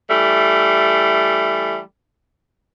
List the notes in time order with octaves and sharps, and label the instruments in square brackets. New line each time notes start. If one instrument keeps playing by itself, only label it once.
[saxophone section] E3 G3 A3